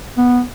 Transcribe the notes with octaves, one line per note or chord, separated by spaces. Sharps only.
B3